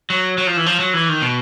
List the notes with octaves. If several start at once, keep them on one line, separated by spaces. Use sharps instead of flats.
F#3
F#3
F3
E3
F3
F#3
E3
D#3
B2